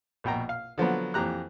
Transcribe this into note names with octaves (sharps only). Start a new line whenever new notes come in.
A#1 B2 G5 A#5
F5
D3 F3 F#3 B3
F2 E3 G4 A#5 F#6